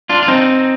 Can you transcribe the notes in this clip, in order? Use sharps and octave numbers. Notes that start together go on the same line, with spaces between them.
D4 F4
F4
C4 D#4